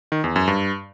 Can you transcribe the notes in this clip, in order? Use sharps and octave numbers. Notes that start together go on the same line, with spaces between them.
D#3
E2
F#2
G2